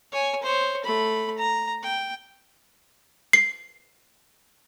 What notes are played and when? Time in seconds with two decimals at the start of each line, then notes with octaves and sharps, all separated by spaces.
0.12 C#5 G#5
0.43 C5 C#5
0.84 A3 B5
1.38 A#5
1.83 G5
3.33 C7